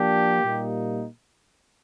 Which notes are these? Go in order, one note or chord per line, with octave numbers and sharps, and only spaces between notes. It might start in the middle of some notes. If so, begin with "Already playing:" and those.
Already playing: F3 A#3 D4 G4
A#2 G3 A#3 D#4